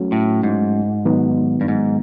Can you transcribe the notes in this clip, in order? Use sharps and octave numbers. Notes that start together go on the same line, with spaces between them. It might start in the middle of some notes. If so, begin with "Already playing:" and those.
Already playing: F#3 A3 C#4 F#4
A2
G#2
D#3 F#3 B3 D#4
G2
G#2